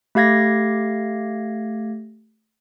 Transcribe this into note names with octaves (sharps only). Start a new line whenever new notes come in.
A3 G4 F5 G#6 A#6